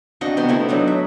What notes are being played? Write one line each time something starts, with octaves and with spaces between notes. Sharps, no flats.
C4 D4 F#4 D#5
C3 B3 C6
A3 B3 E4
F#3 D4 D#4
E5